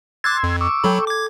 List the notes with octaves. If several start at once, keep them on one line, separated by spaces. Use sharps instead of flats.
C6 D6 E6 F#6 G#6 A6
F2
C#6 D6 E6
F#3 A4 G5 B5
D6 G#6